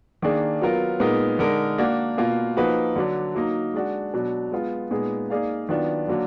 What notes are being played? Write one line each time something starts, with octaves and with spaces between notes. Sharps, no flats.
D#3 A#3 D4 G#4
F#3 B3 F4 A#4
A#2 G#3 B3 D#4 A#4
D3 G#3 D#4 A#4
A#3 D4 F#4 D5
B2 A#3 F4
F3 A#3 D#4 F#4 B4
D3 F#3 D4
F#3 A#3 D#4
G#3 D4 F#4
B2 F#3 D4
G#3 B3 F4
A#2 G#3 B3 D#4 G#4
A#3 D#4 G#4 D5 F5
D#3 F#3 B3 D4 F4
D3 F#3 A#3 D4